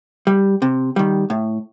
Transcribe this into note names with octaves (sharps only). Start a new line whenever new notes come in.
G3
C3
D#3 G3
A2